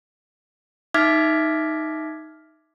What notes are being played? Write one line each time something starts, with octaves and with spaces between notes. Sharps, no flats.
D#4 E5 D6 F6 G#6 B6